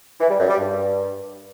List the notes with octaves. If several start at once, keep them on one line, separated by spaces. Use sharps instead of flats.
E3
G3
F#2
G3
G2